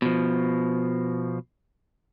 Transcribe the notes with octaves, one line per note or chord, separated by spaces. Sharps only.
B2 F3